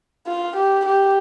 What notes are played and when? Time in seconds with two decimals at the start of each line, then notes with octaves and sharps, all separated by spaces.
0.27 F4
0.56 G4
0.86 G4